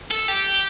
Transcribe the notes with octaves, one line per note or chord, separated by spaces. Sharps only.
A4
G4